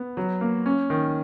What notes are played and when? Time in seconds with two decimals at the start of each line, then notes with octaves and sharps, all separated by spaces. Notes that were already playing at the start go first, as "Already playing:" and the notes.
Already playing: B3
0.17 F#3
0.41 A#3
0.66 C#4
0.90 D#3